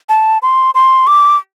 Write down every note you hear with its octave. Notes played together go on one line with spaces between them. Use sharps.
A5
C6
C6
D6